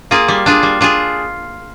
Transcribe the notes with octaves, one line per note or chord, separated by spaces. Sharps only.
A#3 F4 G#4
G3
D4 F4 G#4
G3
D4 F4 G#4